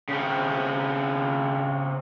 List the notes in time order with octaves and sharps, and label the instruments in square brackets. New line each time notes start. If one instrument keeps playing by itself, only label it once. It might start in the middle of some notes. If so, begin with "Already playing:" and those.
[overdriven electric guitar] C#3 C4